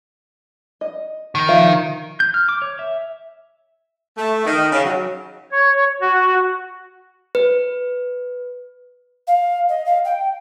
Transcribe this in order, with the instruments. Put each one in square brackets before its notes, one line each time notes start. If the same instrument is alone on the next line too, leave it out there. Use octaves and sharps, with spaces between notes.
[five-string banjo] D#5
[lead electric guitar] D#3
[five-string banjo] F3 E5 F5
[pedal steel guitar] G6
F6
D6
C#5
E5
[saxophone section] A3
D#3
C#3
F#3
[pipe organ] C#5
F#4
[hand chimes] B4
[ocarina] F5
D#5
F5
G5